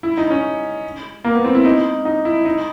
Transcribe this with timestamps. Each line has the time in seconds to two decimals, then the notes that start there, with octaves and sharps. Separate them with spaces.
0.03 E4
0.17 D#4
0.30 C#4
1.24 A#3
1.35 B3
1.45 C4
1.55 E4
1.65 D#4
2.05 D#4
2.25 E4
2.45 D#4